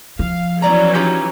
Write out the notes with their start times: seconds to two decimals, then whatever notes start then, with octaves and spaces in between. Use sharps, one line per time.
0.19 F3 F5
0.62 E3 F#3 B3 C#4 D5 A#5
0.95 D#4 F4 G4